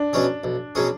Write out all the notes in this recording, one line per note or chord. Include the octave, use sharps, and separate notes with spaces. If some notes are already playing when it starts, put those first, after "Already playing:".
Already playing: D4
B2 F#3 C#4 G#4
B1
B2 F#3 C#4 G#4